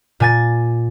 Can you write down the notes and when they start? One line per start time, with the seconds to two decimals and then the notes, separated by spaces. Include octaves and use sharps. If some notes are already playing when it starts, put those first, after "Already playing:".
0.20 A#2 G#5 A6